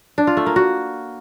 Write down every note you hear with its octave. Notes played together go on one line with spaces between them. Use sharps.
D4
F4
A3
A#3
F#4